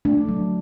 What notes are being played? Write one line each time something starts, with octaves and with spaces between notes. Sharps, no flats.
A3 D4
F#3